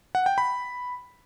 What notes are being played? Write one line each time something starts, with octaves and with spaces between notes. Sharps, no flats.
F#5
G5
B5